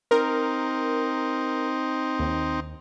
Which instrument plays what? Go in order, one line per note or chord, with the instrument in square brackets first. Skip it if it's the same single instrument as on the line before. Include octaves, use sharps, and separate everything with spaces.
[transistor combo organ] C4 D#4 [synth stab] A#4
[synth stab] D#2